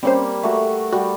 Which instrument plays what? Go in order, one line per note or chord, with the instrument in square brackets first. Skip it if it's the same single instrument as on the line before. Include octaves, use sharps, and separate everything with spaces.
[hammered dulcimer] G3 A#3 [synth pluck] C4 C#4 C5
[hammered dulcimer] A3 F#4
[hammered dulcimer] G3 [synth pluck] F#4